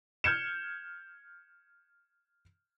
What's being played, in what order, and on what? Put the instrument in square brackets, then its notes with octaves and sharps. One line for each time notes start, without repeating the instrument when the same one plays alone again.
[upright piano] F6 G6 G#6 C#7 E7